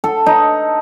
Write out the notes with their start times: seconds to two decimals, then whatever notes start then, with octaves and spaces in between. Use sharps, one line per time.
0.04 A4
0.26 D#4